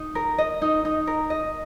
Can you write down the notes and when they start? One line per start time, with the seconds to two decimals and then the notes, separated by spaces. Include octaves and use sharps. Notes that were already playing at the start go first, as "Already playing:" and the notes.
Already playing: D#4
0.15 A#4
0.38 D#5
0.62 D#4
0.85 D#4
1.07 A#4
1.30 D#5